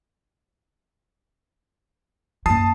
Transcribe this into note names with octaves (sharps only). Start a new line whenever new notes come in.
F#2 A#3 A5 D#6 C7